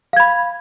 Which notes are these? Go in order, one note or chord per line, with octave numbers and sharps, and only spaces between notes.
F5 B5 G#6